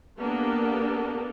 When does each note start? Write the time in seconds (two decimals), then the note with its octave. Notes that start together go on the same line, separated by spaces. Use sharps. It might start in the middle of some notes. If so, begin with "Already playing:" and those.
0.19 A#3 B3 D4 G4 A4